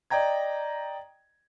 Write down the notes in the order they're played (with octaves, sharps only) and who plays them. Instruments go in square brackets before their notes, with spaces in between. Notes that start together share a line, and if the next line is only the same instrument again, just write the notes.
[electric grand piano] D5 D#5 G5 A#5 G#6